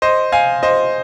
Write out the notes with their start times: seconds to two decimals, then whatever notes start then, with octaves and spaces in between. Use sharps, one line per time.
0.02 C5 D#5
0.32 F5 G#5
0.63 C5 D#5